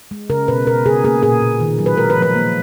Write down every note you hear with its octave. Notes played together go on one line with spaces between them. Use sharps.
G#3
C#3 A#4
B2 B4
B2 A#4
C#3 G#4
A#3 G#4
A#2 G#4
A#2
D#3
F#3
B4
G#3 A#4
B4
F3
B4
A#3